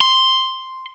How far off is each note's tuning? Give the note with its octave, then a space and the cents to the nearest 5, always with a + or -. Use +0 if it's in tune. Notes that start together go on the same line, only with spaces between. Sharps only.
C6 +0